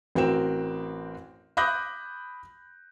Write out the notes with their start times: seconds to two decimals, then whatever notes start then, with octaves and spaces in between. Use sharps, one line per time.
0.15 A1 C4 F#4 A#4 G5 E7
1.57 B5 D6 D#6 F#6 G6 A#6